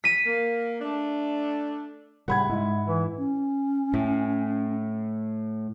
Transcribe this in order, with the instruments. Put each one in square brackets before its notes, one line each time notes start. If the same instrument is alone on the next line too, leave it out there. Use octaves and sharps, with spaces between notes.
[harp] B6 D#7
[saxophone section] A#3
A3 D4
[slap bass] A2 C#3 [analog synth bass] G3 [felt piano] F#5 B5 G#6
[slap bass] G#2 [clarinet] G#3 [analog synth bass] E4
[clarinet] E3 [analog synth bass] E4
[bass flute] C#4
[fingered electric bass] A2